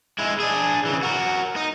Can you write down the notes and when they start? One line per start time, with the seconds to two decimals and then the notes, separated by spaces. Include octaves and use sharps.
0.19 G#3 E4
0.40 D4 G#4
0.85 C#3 E3
1.03 F#4 A#4
1.56 D#4